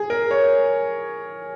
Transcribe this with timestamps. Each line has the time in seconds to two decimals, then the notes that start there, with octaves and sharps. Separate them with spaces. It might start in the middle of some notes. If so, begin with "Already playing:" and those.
Already playing: G#4
0.10 A#4
0.31 C#5